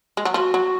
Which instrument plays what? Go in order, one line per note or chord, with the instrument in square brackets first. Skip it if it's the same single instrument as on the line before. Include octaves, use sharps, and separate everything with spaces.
[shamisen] G#3
F#3
[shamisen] F3 [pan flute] F#4
[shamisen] F#3